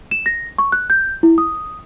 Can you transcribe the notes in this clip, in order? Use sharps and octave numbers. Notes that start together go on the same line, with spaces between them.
E7
A#6
C#6
F#6
G6
E4
D#6